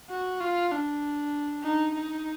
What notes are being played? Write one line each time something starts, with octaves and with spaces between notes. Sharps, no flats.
F#4
F4
D4
D#4
D#4